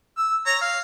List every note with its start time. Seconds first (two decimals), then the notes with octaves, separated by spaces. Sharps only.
0.17 E6
0.46 C#5 A#5
0.61 F5